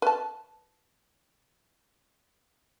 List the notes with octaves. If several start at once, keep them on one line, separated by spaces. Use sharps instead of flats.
B4 A5